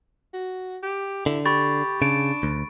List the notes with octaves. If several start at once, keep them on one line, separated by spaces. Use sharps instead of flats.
F#4
G4
D3 E4
G4 B5 C#6 A6
C#3 D4 D7
D2